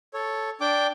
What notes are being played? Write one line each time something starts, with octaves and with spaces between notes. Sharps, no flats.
A4 C#5
D4 G5 D6